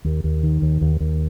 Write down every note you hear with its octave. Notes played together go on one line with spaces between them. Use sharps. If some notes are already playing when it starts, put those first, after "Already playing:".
D#2
D#2
D#3
D#2
D#2
D#2